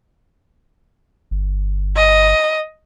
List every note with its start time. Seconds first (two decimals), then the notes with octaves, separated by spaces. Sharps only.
1.31 G1
1.96 D#5